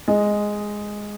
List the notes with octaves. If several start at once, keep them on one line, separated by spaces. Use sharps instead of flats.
G#3 D#5